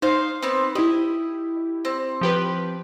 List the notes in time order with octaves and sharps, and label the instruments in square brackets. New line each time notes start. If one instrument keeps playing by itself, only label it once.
[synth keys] D#4 [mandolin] C5 F5
[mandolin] B3 C4
[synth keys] E4 G4 [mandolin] D#5
[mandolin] C4
[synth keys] F3 G4 B4